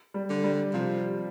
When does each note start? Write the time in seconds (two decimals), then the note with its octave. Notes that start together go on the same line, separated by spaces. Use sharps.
0.14 G3
0.30 D3
0.44 G3
0.74 C3 F3